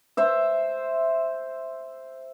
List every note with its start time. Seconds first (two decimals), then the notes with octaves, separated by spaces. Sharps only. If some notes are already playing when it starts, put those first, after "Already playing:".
0.17 C5 E5